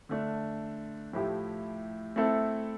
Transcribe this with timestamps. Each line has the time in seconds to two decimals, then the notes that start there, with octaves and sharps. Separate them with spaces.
0.09 D3 A3 D4
1.13 A2 F3 A3 E4 G4
2.16 A3 C4 E4 A4